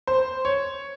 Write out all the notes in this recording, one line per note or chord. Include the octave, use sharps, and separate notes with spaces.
C5
C#5